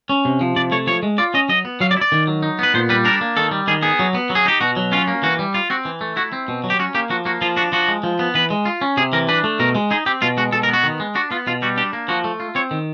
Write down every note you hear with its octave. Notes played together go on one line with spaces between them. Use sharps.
C#4
C3
F3
C3 D5
A3 C#5
F3 C#5
G#3
F4 D5
C#4 D#5
F#3 D#5
B3
F#3 F5
D5
E4
D5
D#3
F#3
D#4
B3 B4
A#2 C5
G3 B4
D4 A#4
A#3
D#3 A4
G3
D#3 G#4
B3 G#4
F#3
B3
F#3
G#4
D#4 G4
B2 F#4
F#3
C#4 F4
A#3
E3 F#4
G3
F4
C4 F#4
E3
A3
E4 F#4
C4
B2
F#3
G4
C#4 F#4
A#3 G4
F3 F#4
A#3 F#4
F3 F4
D4 F#4
F3 F#4
G#3
F3
B3
E3 B4
G#3
F4
C#4
C3 G#4
E3 A#4
D4 B4
A3
B2 A#4
G#3
D#4 G#4
C4 G4
B2 F4
G#3 F#4
B2 A4
A#4
B3 F#4
D#3
G#3
D4 F#4
B3 F4
B2 F4
G3 F#4
D4 G4
A#3
F3 F#4
A3
F4
C4 C#5
D#3